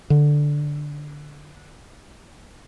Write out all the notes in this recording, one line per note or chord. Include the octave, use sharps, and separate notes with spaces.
D3